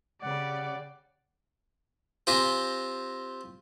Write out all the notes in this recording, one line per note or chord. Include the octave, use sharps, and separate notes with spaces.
C#3 G3 D5 F#5
C4 F4 G4 G#5 A#5